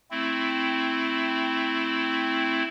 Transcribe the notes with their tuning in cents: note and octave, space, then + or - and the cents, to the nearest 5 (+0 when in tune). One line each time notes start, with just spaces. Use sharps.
A3 +0 C4 +0 E4 +0